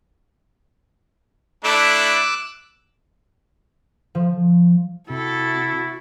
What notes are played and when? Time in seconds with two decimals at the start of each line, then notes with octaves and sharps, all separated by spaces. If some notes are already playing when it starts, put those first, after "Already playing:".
1.64 A3 D4 E4 D6 E6 F#6
4.15 F3
5.10 C3 E4 F#4 A4